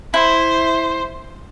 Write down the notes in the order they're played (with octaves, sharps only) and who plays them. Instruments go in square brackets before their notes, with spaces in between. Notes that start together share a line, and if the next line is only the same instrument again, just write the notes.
[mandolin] E4 [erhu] C5